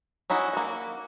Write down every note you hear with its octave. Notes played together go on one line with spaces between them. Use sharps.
C#4 D#4 E4 F#4
A#3 F#4